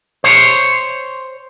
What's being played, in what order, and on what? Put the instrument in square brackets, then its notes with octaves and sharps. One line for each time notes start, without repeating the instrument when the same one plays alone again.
[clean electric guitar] C5 C#5